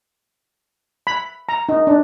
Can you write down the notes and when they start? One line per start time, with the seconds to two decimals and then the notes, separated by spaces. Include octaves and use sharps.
1.07 B5
1.49 A#5
1.69 D#4
1.87 D4